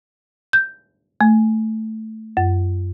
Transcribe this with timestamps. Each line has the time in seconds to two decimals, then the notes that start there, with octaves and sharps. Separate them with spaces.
0.53 G6
1.21 A3
2.37 F#2